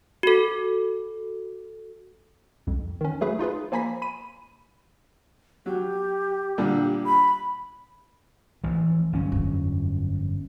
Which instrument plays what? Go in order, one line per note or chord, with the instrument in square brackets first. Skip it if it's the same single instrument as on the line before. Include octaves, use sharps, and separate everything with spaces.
[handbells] F#4 A4
[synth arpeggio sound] C2 F2
D#3 C#4
F#3 A3 G#4 B4
D#4 F4 G#4 B4
F3 A#3 G#5 A#5 B5 B6
B5 D#7
[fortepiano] F#3 [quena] G4
[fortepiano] A#2 D3 G3
[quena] B5
[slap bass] A1 E3 F3
G1 F#3 C#4
[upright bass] F2